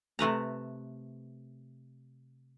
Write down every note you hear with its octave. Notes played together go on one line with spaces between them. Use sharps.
C3 A3 B4 A#5